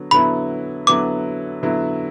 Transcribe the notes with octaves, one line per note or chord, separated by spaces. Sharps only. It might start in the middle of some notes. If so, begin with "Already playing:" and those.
Already playing: D3 F#3 B3
D3 F#3 B3 E4 B5
D3 F#3 B3 E4 D6
D3 F#3 B3 E4